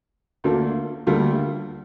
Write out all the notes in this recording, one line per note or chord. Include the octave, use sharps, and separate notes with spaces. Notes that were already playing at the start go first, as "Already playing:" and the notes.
D2 D3 A#3 D4 F4
D2 D3 G3 A#3 F4